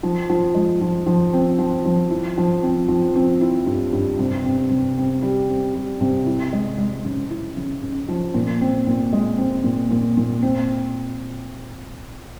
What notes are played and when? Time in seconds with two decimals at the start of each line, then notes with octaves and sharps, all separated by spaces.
0.03 F3
0.30 F3
0.55 G#3
0.81 F3
1.07 F3
1.33 C4
1.59 F3
1.85 F3
2.11 E4
2.38 F3
2.63 C4
2.88 F3
3.16 C4
3.41 E4
3.66 G2
3.93 G2
4.19 C3
4.45 C4
4.70 C3
4.98 C4
5.22 G3
5.49 C4
5.75 G3
6.01 C3
6.26 E4
6.53 G#3
6.78 G#3
7.05 C#3
7.30 E4
7.57 C#3
7.83 C#3
8.08 F3
8.34 A#2
8.61 C4
8.87 A#2
9.13 G#3
9.38 C4
9.64 A#2
9.91 A#2
10.17 A#2
10.42 C4